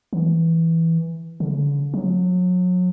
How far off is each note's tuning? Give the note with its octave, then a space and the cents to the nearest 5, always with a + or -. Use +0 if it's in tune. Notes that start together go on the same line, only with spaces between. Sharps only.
E3 -5
D3 -45
F#3 -35